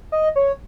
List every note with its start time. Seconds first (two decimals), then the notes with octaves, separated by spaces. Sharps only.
0.12 D#5
0.36 C#5